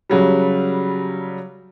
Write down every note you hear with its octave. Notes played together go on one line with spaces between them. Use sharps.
C#3 F#3 G3